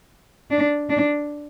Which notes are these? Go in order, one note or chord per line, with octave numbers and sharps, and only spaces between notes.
D4
D4